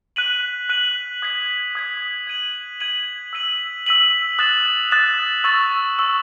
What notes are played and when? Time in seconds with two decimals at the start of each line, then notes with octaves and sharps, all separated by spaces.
0.16 F#6 B6 D#7 F#7
0.69 F#6 B6 D#7 F#7
1.22 D#6 G#6 B6
1.75 D#6 G#6 B6
2.27 G#6 D#7 F#7
2.80 G#6 D#7 F#7
3.33 E6 B6 D#7 F#7
3.86 E6 B6 D#7 F#7
4.39 D#6 F#6 A6 E7
4.91 D#6 F#6 A6 E7
5.44 C#6 E6 A6
5.97 C#6 E6 A6